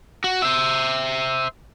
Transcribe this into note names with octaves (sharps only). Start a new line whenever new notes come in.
F#4
C5 E5